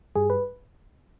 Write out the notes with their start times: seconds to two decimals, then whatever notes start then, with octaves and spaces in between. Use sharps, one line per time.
0.16 G2 G3 G#4
0.30 B4